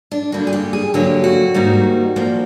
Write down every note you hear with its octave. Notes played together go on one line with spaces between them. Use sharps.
D4
G2 D3 G3 A#3 F#4
G#4
G4
G#4
D2 D3 F#3 A#3 G4
F#4
G#2 D#3 G3 A#3
A#2 F3 A#3